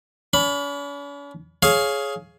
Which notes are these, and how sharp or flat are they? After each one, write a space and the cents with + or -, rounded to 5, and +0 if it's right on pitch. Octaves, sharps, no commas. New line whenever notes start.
C#4 +45 B5 +0
G#4 +15 C#5 +0 F5 +0